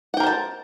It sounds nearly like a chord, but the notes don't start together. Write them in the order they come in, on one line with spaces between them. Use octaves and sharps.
F#5 G5 A#4 C5 A5